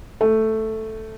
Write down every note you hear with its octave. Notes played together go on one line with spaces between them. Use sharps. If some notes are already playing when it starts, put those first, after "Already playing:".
A3